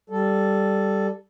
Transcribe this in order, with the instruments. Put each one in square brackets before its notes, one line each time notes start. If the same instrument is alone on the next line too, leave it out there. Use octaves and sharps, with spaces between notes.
[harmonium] G3 A4